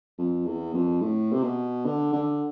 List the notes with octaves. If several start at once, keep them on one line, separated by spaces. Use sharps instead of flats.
F2
E2
F2
A2
C3
B2
D3
D3